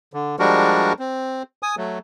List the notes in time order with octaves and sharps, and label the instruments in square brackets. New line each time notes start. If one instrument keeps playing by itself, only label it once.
[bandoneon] D3
F3 G3 G#3 D4 F#4 A#4
C4
G#5 D#6
F#3 A3